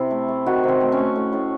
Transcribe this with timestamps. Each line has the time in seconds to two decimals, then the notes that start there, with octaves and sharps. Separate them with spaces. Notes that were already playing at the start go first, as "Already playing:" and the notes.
Already playing: C3 E4
0.11 A3
0.28 A3
0.46 D#3 F#4
0.63 C3 C4
0.80 A3
0.92 C#4
0.98 A3
1.16 A2
1.33 A2